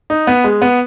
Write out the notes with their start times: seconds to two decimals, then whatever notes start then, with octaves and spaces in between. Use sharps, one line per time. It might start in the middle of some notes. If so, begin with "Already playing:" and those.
0.10 D#4
0.27 B3
0.44 G#3
0.62 B3